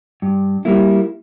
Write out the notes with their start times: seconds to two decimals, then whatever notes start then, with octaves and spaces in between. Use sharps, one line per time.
0.22 G2
0.65 G3 A#3 E4